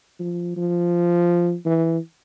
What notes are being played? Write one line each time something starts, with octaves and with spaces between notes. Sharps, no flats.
F3
F3
E3